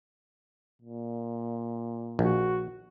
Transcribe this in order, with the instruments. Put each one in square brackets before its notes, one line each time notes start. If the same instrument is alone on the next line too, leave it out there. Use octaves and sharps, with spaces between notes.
[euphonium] A#2
[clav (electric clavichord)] A#1 [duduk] F#4